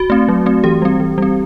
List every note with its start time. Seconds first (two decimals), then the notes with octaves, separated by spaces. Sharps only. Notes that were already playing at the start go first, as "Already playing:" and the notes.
Already playing: F#4
0.10 A3 C4
0.29 F#3
0.46 A3 C4
0.64 E3 G4
0.82 G3 C4
1.00 E3
1.18 G3 C4